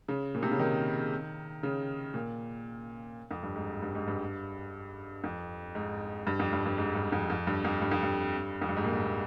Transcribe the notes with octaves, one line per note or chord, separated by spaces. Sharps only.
C#3
A#2
C3
C#3
D#3
C#3
A#2
F2
G2
G#2
G2
G#2
G2
F2
G#2
G2
F2
G2
G2
G#2
G2
F2
F2
G2
F2
G2
F2
G2
F2
G2
G#2
A#2
A#2